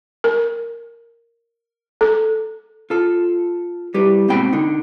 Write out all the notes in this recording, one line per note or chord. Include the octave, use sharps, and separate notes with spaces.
A#4
A4
F4 A4
G3 E4 G4 B4
G#2 B2 A#3 C4 G5 B5
D3 D#4